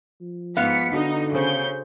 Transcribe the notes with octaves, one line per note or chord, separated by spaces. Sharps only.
F3
G#2 B3 F5 B6 C#7
D3 D4 D#4 F#4 A4
C#3 A4 C5 G6